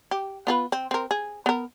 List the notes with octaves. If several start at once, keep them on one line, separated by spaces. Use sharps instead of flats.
G4
B3 F4 B4
C4
C4 A#4
G#4
B3 A#4